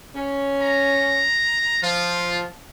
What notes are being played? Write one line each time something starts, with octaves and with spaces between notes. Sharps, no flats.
C#4
A#5
F3 F4